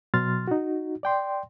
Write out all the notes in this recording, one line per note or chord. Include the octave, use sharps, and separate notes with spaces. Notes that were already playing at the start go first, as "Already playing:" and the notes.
B2 F#3 C6 F6 A6
D#4 F#4
D5 G5 C6